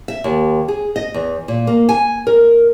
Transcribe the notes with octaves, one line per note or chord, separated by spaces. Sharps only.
E5
D#2
G#4
D#5
E2
A#2
A#3
G#5
A#4